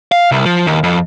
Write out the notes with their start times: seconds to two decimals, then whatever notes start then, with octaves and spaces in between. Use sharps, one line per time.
0.12 F5
0.31 C2
0.45 F3
0.67 D#2
0.83 F2